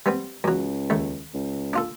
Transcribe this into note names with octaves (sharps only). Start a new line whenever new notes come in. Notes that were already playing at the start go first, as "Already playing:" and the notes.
G3 B3 C4
C#2 F#2 F#3
D#2 A3
C#2
D4 F4 A4